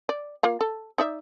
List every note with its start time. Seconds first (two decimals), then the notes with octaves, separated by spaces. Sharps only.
0.09 D5
0.43 A#3 F4 F5
0.61 A4
0.98 D#4 D5 E5